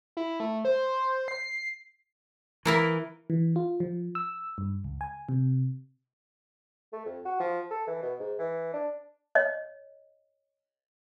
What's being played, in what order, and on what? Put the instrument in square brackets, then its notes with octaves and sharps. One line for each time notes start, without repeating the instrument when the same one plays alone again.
[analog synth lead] E4
A3
C5
C7
[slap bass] E3 [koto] A#3 E4 A#4
[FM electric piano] E3
F4
F3
E6
G2
C#2
G#5
C3
[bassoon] A3
F2
F#4
F3
A4
E3
B2
G#2
E3
D4
[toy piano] C#5 D#5